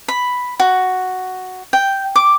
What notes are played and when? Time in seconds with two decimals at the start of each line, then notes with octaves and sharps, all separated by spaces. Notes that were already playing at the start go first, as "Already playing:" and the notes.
0.08 B5
0.60 F#4
1.73 G5
2.16 D6